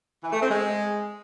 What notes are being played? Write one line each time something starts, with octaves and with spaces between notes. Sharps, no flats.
E3
A3
C4
G#3